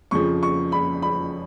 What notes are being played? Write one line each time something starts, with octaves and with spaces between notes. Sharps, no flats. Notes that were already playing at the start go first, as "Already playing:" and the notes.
F2 C#3 F3 C#6
C#6
B5
B5